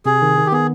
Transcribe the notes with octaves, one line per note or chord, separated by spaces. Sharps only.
C3 G#4
D#3
D#3
G4
B3 G#4